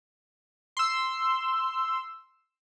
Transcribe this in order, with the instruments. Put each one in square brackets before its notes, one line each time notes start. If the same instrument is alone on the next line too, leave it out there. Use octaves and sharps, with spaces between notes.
[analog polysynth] C6 E6